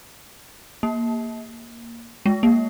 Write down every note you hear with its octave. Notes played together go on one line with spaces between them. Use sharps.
A#3
G#3
A#3